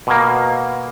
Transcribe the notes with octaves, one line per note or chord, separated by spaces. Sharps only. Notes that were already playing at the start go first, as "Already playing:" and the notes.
B2 A#3